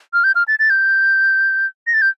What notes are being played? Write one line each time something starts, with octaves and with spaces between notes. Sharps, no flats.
F6
G6
F6
A6
A6
G6
A#6
A6
G6